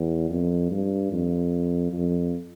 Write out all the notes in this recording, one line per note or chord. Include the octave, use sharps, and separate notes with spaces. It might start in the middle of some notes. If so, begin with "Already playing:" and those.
Already playing: E2
F2
G2
F2
F2